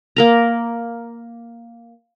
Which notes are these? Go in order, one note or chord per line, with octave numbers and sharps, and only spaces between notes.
A#3 A#4 A#5